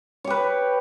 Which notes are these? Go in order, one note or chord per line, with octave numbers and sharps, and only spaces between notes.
G4 B4 C#5